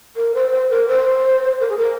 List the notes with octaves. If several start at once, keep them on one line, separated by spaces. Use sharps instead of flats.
A#4
C5
C5
A#4
C5
A#4
G#4
A#4